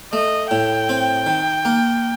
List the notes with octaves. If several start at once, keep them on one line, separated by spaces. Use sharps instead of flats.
A3 D#5
A2 G5
C4
D#3
A#3